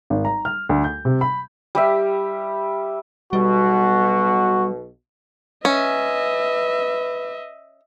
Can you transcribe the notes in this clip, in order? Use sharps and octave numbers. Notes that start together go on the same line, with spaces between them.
G#1
A#5
F6
D2
G6
C3
B5
G3 G4 E5
B1 B2 G3 F#4
C#4 B4 D#5 E5